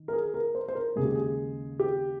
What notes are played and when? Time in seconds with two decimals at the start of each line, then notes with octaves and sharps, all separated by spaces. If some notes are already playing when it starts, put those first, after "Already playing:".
Already playing: D#3
0.08 A#4
0.13 G#4
0.34 A#4
0.55 C5
0.68 C5
0.75 A#4
0.95 D#2 C#3 G#3 G#4
1.05 G4
1.15 G#4
1.80 G4